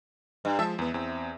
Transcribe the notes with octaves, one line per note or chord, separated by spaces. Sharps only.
G2
F3 G#3 E5 A5
E2 B3
E2 C4